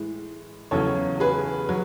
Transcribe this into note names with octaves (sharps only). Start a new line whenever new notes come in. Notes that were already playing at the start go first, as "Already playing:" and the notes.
Already playing: A2 E3 G#3
E2 C#3 F#3 A4 C#5
G#4 B4
F#3